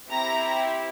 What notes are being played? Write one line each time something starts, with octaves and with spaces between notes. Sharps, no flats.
C4 E4 G4 A#5